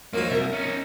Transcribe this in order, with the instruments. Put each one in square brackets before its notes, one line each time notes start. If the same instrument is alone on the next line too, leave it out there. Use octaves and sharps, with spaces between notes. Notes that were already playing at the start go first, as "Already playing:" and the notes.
[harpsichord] F#2 F3 F5 [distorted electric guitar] A#3 D#4
[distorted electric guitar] C2 [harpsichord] A#4 E5
[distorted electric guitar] C#4 D#4